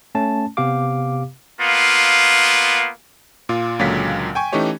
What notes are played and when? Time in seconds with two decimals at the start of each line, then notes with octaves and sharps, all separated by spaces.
0.15 A3 C#4 A5
0.57 C3 B3 G4 F5 D6
1.61 A#3 B3 F4
3.49 A#2 F4
3.79 C#2 A#2 D3 F#3 F5 B6
4.35 G5 G#5 C#6
4.53 E3 A3 C#4 D#4 G4 C#5